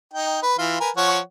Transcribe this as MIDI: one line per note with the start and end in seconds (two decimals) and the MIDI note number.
0.14 0.39 63
0.14 0.39 79
0.43 0.58 71
0.59 0.76 52
0.59 0.76 65
0.81 0.90 70
0.81 0.90 71
0.81 0.90 80
0.97 1.19 53
0.97 1.19 73
0.97 1.19 78